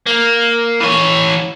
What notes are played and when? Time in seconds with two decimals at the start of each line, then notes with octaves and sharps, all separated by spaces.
0.07 A#3
0.80 E3 C#5